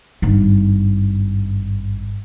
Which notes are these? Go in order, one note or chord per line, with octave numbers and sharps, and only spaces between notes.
G#1 G2